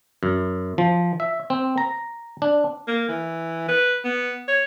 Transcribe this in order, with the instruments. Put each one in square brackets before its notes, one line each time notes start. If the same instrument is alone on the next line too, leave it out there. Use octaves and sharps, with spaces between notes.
[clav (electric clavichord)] F#2
F3
E5
C4
A#5
D4
[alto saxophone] A#3
E3
B4
B3
C#5